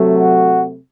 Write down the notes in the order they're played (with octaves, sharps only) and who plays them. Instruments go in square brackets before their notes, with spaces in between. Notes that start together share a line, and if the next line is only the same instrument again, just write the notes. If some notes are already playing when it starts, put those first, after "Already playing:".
Already playing: [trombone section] C3 F#3 A3
F#4